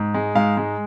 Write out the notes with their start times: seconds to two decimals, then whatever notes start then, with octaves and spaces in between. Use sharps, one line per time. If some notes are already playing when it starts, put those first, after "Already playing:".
Already playing: G#2
0.14 G#3
0.35 G#2 F5
0.57 G#3